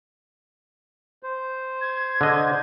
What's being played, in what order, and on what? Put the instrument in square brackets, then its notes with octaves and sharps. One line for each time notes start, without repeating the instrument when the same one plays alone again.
[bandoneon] C5
[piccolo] G#6
[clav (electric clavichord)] D3 D#5